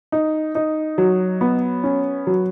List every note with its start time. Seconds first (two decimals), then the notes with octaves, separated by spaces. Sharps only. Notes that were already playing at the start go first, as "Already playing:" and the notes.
0.12 D#4
0.55 D#4
0.98 F#3
1.41 B3
1.84 C#4
2.27 F#3